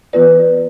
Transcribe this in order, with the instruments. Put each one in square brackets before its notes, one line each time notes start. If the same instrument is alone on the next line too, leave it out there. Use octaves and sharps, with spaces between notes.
[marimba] E3 B3 F4 B4 D5